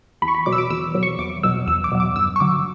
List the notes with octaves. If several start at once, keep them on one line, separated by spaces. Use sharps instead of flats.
E2 B5
C#6
B5
B2 F#3 D6
E6
D6
E2 E6
B2 F#3
C#6
E2 D6
B2 F#3 E6
E2 E6
D6
B2 F#3
D6
G2 E6
C#6
D3 F#3 D6